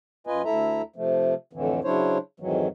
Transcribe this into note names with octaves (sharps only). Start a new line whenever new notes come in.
F#2 F4 B4 D#5 G#5
D2 E4 A4 E5 A#5
C3 F3 A3
F2 A2 D3 E3
C#3 F#3 D4 E4 C5 C#5
F2 G#2 D#3 E3 F#3